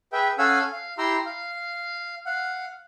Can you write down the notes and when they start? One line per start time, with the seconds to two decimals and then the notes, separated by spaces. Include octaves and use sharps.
0.13 G#4 B4 E5 G5
0.38 C#4 A4 F5 F#5 G#5 E6
0.72 F5
0.98 E4 G4 G5 A#5 C6 E6
1.25 F5
2.26 F5 F#5